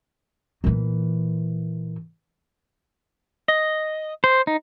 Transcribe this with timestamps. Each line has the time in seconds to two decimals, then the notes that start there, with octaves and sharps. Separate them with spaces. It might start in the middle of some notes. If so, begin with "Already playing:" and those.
0.64 A#2 E3
3.48 D#5
4.24 C5
4.47 D#4